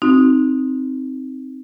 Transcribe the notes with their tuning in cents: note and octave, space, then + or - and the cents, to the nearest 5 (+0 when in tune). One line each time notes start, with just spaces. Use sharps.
C4 +0 D#4 +0 F#4 -15